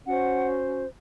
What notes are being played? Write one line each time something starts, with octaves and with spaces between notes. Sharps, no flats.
C#4 F#4 C5 F#5